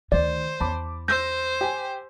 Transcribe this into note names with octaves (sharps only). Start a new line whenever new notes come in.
D2 D#3 C5 D5
E2 A5 B5 D6
C5 E6 G6 A#6
G4 G#5